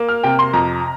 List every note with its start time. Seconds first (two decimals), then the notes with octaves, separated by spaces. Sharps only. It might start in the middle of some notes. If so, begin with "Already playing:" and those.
Already playing: A#3
0.09 F6
0.23 C3 G5
0.39 C6
0.53 F2 A#5